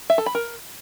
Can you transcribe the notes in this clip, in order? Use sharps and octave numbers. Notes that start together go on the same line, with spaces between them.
E5
A4
B5
A#4